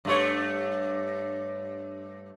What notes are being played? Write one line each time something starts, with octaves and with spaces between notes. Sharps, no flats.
G2 A3 C#5